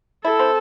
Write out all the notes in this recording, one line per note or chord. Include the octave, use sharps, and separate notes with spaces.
E4 A4
C4